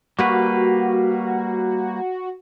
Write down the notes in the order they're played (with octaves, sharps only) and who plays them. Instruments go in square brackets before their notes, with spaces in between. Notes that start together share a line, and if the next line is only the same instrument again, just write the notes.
[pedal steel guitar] G3 A#3 B4 [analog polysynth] F#4